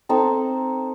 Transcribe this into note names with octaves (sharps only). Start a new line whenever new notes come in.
C4 D#4 A4